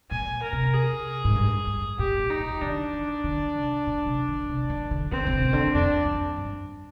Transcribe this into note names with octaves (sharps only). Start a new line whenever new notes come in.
A#2 G#5
A#4
C3
G#4
G#2
G2
G2
A#2 G4
A#2
D#4
A#2
D3 D4
D#3
D3
C3
A#2
C3
D#3
C3
D#3
D3
D3 C4
D3
C3
C3
D3
F2 D4
F2
G2